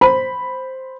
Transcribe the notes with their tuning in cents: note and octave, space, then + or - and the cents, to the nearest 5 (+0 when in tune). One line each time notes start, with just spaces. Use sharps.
C5 +0 B5 +0